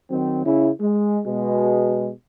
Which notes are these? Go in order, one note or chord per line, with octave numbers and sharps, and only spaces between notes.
D#3 F#3 C4
C#3 C#4 E4
G#3
B2 G#3